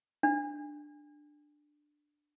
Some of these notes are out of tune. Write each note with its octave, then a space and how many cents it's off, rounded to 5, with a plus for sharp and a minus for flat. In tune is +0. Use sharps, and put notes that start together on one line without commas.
D4 +10